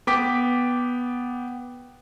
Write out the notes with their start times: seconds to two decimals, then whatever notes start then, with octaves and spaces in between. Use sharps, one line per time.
0.07 B3 G5 D6 B6